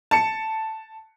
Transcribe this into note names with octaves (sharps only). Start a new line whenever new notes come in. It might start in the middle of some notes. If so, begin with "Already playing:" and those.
A5 C#7